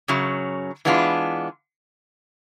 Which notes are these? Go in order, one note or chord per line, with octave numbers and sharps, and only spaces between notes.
F#2 C#3 F#3
E3 G#3 B3 D4 F4